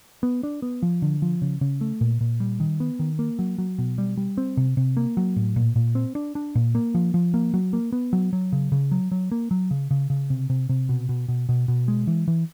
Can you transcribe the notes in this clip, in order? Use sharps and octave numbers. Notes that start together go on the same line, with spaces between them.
B3
D4
B3
F3
D3
F3
C#3
C#3
A3
A#2
A#2
G3
D#3
B3
D#3
A#3
F#3
F#3
B2
G3
G3
C4
C3
C3
A#3
F#3
A2
A#2
A#2
C4
D4
D4
A#2
A#3
F3
F3
A#3
F#3
A#3
B3
F#3
F#3
C#3
C#3
F#3
F#3
A#3
F#3
C#3
C#3
C#3
C3
C3
C3
B2
B2
B2
B2
B2
G#3
E3
E3